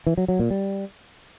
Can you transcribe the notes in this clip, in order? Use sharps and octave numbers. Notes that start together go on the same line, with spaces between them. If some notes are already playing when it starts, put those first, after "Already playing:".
E3
F#3
F#3
A#2
G3